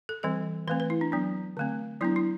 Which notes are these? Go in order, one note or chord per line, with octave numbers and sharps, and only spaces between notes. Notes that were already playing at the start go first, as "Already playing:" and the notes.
A4
E3 G3 C4 A4
E3 A3 C4 B4
B4
E4
D4
F#3 B3 D4
D3 A3 C4
F#3 B3 D4 E4
E4